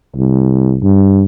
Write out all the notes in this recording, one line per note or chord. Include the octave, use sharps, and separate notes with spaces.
C2
G2